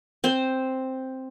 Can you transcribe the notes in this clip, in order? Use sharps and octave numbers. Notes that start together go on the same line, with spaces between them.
C4 C5